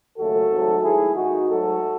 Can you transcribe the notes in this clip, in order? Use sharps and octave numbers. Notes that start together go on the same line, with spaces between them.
D#2 C#3 F#3 A3 F#4 A4
G#1 G#2 F#3 A3
G#2 D#3 F#3 A3 E4 G#4
D#2 D#3 G#3 D#4 F#4
G#2 F#3 A3 F#4 A4